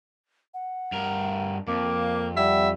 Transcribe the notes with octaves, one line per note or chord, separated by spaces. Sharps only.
F#5
G2 A#4
F2 A#3 D6
G3 E5 F#5